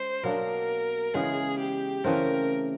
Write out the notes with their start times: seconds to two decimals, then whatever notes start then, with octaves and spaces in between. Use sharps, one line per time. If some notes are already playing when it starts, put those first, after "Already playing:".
Already playing: G#3 C#4 C5
0.23 B2 F#3 A#3 D4 A#4
1.14 C#3 E3 G#3 B3 G#4
1.59 G4
2.04 C#3 E3 A3 C4 A#4